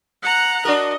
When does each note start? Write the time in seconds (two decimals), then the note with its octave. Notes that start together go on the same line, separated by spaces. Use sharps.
0.24 F#5 A#5 F#6
0.65 D4 F#4 A#4 D#5